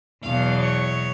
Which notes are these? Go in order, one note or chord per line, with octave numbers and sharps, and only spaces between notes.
E2 B2 F#3 F5
C#5